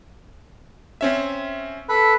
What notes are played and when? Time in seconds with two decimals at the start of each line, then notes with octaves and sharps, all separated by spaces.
1.01 C4 C#4 E5
1.89 A4 B4 B5